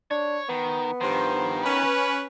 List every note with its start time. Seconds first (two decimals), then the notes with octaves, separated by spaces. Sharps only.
0.11 D4 C#5
0.49 D#3 B3
1.01 G2 D#3 F3 C5
1.63 C#4 B4